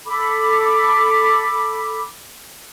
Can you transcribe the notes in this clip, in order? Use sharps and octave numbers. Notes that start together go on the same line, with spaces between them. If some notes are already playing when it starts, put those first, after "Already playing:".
A4 B5 D6